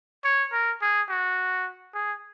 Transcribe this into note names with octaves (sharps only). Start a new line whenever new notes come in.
C#5
A#4
G#4
F#4
G#4